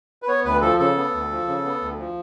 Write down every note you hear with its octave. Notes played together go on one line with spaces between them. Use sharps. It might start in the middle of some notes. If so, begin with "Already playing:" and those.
B4
B3 C#5
D2 B4
F3 A4
C#3 A4
B3
D2
F3
C#3
B3
D2
F3